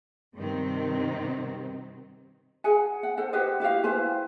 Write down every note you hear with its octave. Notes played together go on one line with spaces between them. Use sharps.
G2 C3 D#3 C4
G#4 F#5 G#5
F#5
A4 C5 F#5
G4 B4 C5 D#5
E4 F#4 G4 F5
E4 B4 C5 G#5